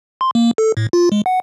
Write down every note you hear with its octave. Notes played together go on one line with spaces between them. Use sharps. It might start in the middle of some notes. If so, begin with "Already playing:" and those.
C6
A#3
A4
A2
F4
G#3
F#5